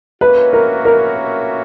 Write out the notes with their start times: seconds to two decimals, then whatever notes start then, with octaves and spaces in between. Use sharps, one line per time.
0.21 A#3 C#4 F#4 B4 C#5 E5
0.53 A#4
0.85 A#4